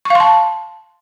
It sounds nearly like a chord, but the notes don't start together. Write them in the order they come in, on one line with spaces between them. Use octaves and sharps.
C#6 F5 C6 A5